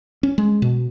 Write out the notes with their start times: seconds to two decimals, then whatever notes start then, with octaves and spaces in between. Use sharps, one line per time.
0.23 C#4
0.38 G#3
0.62 B2